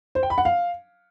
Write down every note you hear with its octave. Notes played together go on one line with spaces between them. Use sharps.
C5
G5
B5
F#5
F5